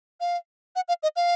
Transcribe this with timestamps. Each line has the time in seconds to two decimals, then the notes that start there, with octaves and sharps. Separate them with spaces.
0.20 F5
0.76 F#5
0.88 F5
1.03 D#5
1.16 F5